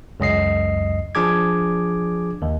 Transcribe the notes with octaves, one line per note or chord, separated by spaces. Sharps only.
C#2 F#2 D#5 C7
F3 D4 G#4 D6 G#6
D#2